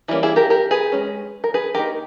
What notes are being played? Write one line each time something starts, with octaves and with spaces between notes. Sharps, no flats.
E3 G3 A#3 C#4 E4
E4 G#4
G4 A#4
G4 A#4
G#4 B4
G#3 C#4
A#4
G#4 B4
D#3 A#3 D#4 G4 A#4